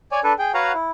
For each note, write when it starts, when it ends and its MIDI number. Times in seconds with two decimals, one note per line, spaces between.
0.12 0.20 73
0.12 0.20 74
0.12 0.20 80
0.24 0.33 62
0.24 0.33 69
0.24 0.33 71
0.39 0.52 68
0.39 0.52 79
0.54 0.72 66
0.54 0.72 71
0.54 0.72 73
0.54 0.72 77
0.54 0.72 78
0.54 0.72 82
0.74 0.91 64